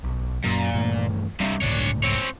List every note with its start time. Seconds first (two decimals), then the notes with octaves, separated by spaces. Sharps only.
0.04 B1
0.44 F#2 A#2 F#3
0.74 G2 E3 A3
1.40 G2 C3 G3 B3 C4
1.62 G1 C#2 A2 D4 C#5
2.03 C4 C#5